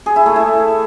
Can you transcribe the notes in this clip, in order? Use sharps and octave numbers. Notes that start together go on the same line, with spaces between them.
G#4
E4
A3
E4